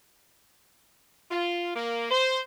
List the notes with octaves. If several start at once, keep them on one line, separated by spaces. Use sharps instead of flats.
F4
A#3
C5